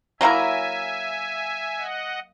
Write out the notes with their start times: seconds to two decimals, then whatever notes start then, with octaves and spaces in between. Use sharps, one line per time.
0.21 F#3 A#3 E4 A#4 E5 G#5
1.78 D#5 F#5